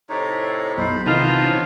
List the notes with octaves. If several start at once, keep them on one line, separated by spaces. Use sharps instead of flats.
A2 C3 D#4 C#5
B1 C5 B5 C7
C3 D#3 E3 B3 D#4 F4 C5 A5
C#4